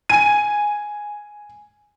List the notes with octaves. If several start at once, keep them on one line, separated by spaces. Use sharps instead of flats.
G#5 D#7